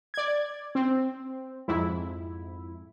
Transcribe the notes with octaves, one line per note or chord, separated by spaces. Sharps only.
D5 G#6
C4
F2 G#2 E4